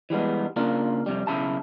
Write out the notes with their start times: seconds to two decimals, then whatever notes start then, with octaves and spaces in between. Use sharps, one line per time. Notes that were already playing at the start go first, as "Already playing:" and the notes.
0.10 E3 G3 G#3 B3
0.56 C#3 A#3 D4 F4
1.06 F2 C3 G3
1.27 B1 C#3 E4 A5